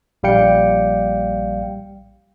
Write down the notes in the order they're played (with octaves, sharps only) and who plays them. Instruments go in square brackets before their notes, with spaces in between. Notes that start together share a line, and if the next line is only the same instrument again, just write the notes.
[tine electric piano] A#1 G3 F5 G5 C#7